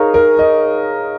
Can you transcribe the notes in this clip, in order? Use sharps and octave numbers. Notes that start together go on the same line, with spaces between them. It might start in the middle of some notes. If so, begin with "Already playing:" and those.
Already playing: D#4 G#4 A#4 C#5 F5
A#4
D#5